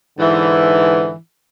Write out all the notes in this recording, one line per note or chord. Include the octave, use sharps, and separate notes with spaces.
G#2 D3 E3